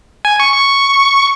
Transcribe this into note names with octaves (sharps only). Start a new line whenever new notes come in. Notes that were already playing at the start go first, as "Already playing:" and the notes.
G#5
C#6
C#6